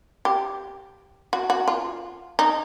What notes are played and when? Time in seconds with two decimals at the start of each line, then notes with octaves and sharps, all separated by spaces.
0.25 G4
1.33 F#4
1.50 F#4
1.68 F4
2.39 D#4